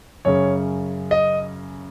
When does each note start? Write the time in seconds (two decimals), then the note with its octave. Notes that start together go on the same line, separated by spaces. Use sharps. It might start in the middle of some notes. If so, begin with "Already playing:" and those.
0.25 F#2 C#3 C#5
1.11 D#5